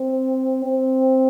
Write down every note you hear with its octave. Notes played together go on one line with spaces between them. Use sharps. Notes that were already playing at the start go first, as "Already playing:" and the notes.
Already playing: C4
C4